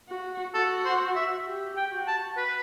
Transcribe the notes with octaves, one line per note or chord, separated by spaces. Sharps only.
F#4
F#4 A4
C5
E5
G4
G5
F#4
A5
B4